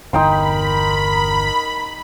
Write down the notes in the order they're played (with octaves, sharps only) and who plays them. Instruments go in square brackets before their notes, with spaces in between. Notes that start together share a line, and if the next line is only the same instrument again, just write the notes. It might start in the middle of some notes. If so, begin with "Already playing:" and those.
[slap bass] G1 E2 [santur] D#4 G5 C6 [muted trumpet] A#4 [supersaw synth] B5